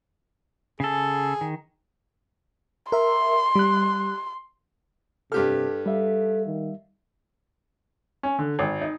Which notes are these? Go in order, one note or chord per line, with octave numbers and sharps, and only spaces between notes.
C#3 G#4 A4
D#3
A#4 E5 C6
G3 F#6
G2 C3 G4 A4 F6
G3 A4 E5 F5
D#3
C#4
D3
G#1
D#4